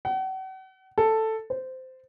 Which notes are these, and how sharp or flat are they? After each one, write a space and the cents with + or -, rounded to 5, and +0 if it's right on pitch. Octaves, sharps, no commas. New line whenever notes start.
F#5 +40
A4 +5
C5 -15